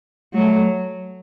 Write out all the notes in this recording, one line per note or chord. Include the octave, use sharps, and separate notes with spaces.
F#3 A3